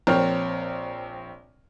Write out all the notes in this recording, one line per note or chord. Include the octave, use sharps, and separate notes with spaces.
A#1 C4 A#4 C#5 G5 F6